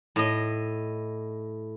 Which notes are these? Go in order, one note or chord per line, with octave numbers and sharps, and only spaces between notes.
A2 D#5